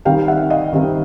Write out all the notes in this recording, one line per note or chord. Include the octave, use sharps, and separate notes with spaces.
D#3 G3 C4 D#4 F5 G5
E5 F#5
D#5 F5
D#3 G3 C4 D#4